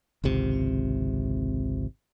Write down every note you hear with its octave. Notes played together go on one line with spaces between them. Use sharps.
G#1 C#2 C3